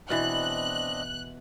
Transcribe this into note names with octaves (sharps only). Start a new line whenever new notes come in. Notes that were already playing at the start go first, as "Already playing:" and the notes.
B2 E3 C4 D4 D#5 F#6